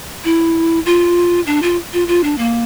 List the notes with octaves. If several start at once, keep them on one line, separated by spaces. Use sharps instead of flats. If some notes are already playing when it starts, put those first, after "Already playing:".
E4
F4
D4
F4
F4
F4
D4
A#3